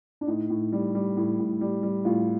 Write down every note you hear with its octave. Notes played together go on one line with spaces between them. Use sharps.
D4
A2 D#4
A2
G3
G3
A2
A2
G3
G3
A2 F4